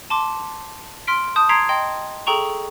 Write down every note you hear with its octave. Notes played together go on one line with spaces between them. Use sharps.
A5 C6 D6
C6 F6 B6 D7
A5 D#6 G6
A#5 C6 G#6 B6 C7 D7
D#5 G5 C6
G#4 A4 G5 A#5 C#6 F7